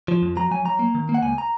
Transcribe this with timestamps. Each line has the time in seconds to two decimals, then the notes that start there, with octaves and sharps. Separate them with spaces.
0.08 F3
0.22 F2
0.37 F#3 A#5
0.51 F#3 G#5
0.65 F#3 A#5
0.79 A#3
0.95 D#3
1.09 A#3
1.14 F#5
1.22 C#2 G#5
1.38 A#5